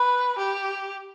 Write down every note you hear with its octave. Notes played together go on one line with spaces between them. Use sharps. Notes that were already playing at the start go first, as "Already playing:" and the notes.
Already playing: B4
G4